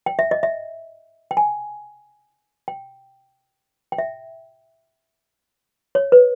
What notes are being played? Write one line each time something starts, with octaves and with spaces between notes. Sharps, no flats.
G5
E5
D#5
E5
G5
G#5
G5
G5
E5
C#5
B4